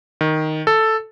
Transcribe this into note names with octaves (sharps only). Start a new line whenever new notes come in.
D#3
A4